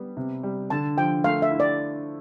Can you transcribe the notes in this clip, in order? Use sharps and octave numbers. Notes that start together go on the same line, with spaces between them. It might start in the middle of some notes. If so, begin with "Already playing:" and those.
Already playing: G3 B3
C3
G3
D3 A5
F3 G5
A3 F5
E5
E4
D5